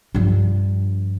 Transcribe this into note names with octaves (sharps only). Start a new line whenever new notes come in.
G2 F3